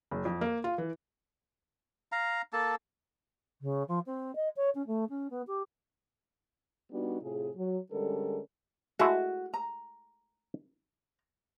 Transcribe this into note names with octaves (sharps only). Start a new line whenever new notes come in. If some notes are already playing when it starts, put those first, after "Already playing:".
F#1
F2
A#3
F4
E3
F5 A#5
A#3 A4 A5
C#3
F3
C4
D#5
C#5
C#4
A3
C#4
B3
G4
G3 B3 D4 D#4 F#4
A2 C3 F4 G#4
F#3
D3 G3 G#3 C#4 A4 A#4
G#3 A3 E4 F#4
A#5